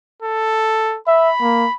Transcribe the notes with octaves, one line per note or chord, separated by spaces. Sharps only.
A4
E5 B5
A#3